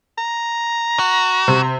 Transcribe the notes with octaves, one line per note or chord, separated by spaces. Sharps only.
A#5
F#4
C3